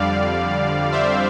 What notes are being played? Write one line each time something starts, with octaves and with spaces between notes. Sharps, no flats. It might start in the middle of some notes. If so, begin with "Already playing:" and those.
Already playing: F2 D3 G3 D5 F5
C5 E5